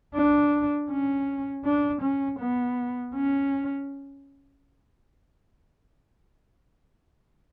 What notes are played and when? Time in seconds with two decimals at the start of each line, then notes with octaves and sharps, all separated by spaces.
0.15 D4
0.90 C#4
1.65 D4
2.02 C#4
2.39 B3
3.15 C#4